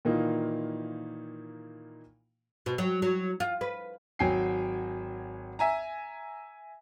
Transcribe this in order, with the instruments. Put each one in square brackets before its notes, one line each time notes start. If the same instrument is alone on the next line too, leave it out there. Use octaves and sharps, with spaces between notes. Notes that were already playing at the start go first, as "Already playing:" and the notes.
[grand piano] A#2 D#3 E3 A#3 D#4 F4
[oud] B2
F#3
F#3
F4
B4
[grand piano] G#1 F#3 G5 G#5 C7
E5 G#5 A#5